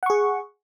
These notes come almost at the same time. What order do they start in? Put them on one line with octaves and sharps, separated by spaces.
F#5 C#6 G#4